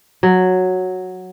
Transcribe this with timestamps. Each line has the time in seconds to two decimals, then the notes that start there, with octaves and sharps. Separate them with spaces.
0.23 F#3